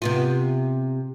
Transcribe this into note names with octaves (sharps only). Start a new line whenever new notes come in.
C3 B3 F4